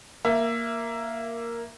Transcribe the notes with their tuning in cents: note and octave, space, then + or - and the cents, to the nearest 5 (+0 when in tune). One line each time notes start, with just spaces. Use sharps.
A#3 +0 E5 +20